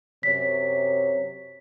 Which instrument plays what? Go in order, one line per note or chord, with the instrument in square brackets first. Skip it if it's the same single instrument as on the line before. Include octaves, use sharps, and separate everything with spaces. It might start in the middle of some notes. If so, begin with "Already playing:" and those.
[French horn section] F#2 C3 C#5 [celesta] B6